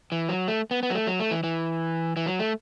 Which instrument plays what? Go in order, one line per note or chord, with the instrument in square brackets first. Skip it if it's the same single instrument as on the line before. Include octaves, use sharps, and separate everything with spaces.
[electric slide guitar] E3
F#3
A3
B3
B3
F#3
A3
F#3
A3
E3
E3
E3
F#3
A3